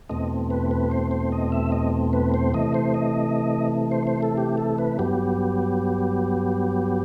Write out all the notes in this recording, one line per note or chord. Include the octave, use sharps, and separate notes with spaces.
E2 B2 A3 C4 D#5
B4
B4
C5
C5
D#5
E5
D#5
B4
C5
C3 E3 A3 D#5
C5
D#5
C5
C5
A4
G4
A4
B4
G2 F#3 B3 G4